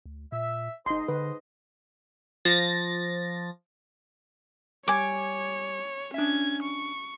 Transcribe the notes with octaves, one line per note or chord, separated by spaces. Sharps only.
D2
A#2 E5
F#1 G#2 D#4 C5 D#5 C6
D3 B4
F3 A6 A#6
G3 C#5 G#5 D6
C#4 D4 E5 G#6
C#6